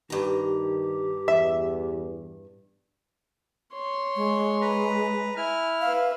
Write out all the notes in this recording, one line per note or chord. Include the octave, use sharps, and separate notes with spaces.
G2 D#3 G4 A#5
E2 E5
C#5 C6
G#3
B4 A#5
E4 G#5 F6
B4 E5 F5